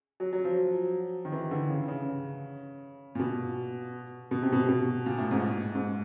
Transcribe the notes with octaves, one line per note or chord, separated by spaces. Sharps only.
F#3
F#3
F3
D#3
E3
D3
C#3
C#3
A#2
B2
B2
C3
B2
B2
A#2
A2
G#2
G#2